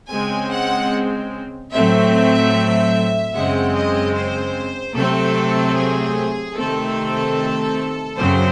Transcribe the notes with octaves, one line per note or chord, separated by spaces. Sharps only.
C#3 G#3 C4 G#5
F#5
A2 F#3 A3 C4 E5
F#2 C#3 G#3 C4 F#5
D#5
C5
C3 F#3 A3 C4 A4
G#4
C3 D#3 A3 C4 A4
F#2 C#3 F#3 C4 C5